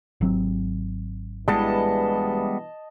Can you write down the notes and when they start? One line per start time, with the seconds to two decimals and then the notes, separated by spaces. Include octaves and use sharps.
0.21 G#1 F#3 C4
1.48 G2 B2 E3 G3 G#3 B3 D#5 A5